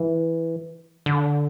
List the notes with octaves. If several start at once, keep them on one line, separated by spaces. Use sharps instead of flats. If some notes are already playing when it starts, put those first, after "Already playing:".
Already playing: E3
D3